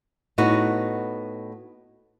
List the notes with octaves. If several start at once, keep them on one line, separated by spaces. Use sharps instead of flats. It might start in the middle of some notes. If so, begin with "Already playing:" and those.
A2 B3 D#4 F#4